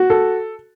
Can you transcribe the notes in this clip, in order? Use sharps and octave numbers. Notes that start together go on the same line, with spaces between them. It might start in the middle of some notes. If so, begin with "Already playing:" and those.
Already playing: F#4
A4